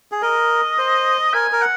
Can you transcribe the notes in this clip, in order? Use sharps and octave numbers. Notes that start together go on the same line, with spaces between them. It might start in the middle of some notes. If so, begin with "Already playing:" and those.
G#4
A#4 D#5
C5
A#4 G#5
A#4
F#5